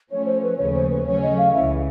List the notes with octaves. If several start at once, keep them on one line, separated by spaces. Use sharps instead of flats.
F3 A3 C#4 C#5
C5
B4
D#2 C#3 F3 A3 C#4 C#5
C5
B4
C#3 F#3 A3 C#4 C#5
D#5
F5
C#2 C#3 E3 E5